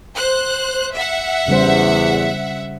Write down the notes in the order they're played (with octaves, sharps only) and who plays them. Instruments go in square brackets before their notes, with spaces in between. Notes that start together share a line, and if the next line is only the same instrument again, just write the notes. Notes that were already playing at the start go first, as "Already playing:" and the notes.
[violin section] C5 F#6
E5 F#5
[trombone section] E2 [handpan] C#3 G3 C5